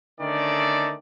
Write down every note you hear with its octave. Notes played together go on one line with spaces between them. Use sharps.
D3 D#3 A3 C#4 D5